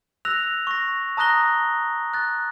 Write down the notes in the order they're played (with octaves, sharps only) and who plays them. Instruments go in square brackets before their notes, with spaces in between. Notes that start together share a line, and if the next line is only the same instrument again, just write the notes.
[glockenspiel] E6 F#6 A#6 F7
C#6 A#6
A5 A#5 D#6 F#6 A#6 G7
F#6 A6